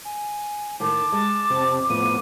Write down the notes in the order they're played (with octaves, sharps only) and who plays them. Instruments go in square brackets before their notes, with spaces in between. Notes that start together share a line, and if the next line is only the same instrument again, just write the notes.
[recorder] G#5
[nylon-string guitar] A2 D#3 [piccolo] A5 [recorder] D6
[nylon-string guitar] G#3 [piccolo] A5
[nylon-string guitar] F2 [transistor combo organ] C3
[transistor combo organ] A2 F3 B3 [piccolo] D#7